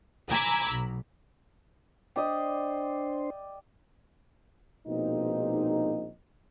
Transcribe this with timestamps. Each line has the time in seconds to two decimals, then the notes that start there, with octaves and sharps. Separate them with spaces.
0.30 G#5 A#5 B5 D6 E6 G#6
0.67 B1
2.16 D4 G4 C5 D5 D#5
4.87 A#1 B2 G#3 A#3 C4 D#4